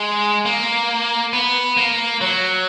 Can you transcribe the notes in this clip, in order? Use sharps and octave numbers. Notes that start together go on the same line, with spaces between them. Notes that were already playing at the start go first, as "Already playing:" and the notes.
Already playing: G#3
A#3
B3
A#3
F#3